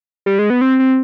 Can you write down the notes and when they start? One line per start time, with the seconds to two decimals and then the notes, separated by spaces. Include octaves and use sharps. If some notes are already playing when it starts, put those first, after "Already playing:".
0.26 G3
0.39 G#3
0.50 B3
0.61 C4
0.79 C4